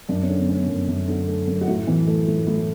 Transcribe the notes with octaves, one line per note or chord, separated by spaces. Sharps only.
F#2 D4
C#4
D3
B3
A3 C#4
F#2
F#2
D3
A3
F#2
F#4
A2 E4
E3
A3
A2
A2